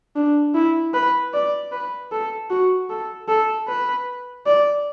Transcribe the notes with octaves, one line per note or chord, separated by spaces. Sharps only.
D4
E4
B4
D5
B4
A4
F#4
A4
A4
B4
D5